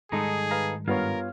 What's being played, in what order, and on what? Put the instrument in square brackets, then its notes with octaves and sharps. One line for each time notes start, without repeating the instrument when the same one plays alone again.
[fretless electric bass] G#2 D#3 G3 [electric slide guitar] G#3 D#4 A4 [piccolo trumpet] G#4 [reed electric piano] A#5
[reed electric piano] B4 F5 A#5
[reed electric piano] G2 B3 C#5 [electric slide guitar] F4 G#4 [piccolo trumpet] A#4